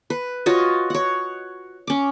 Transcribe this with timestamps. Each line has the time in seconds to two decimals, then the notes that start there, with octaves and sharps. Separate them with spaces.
0.10 B4
0.46 F4 F#4 C#5 D#5
0.90 C#5 F#5
1.87 C#4 D6